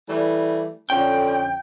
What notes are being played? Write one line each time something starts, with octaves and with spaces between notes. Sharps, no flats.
E3 G3 A3
F2 D3 C#4 G5